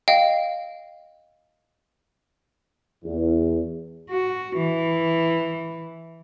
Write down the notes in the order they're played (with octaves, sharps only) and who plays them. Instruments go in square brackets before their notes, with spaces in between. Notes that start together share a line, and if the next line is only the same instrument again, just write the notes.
[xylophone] D#5 F5 G5
[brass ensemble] E2
[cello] F#4
E3